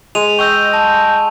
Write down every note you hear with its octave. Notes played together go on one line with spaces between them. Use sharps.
G#3 D#7 F7
D#5 G5 C#6 E6 G6
A5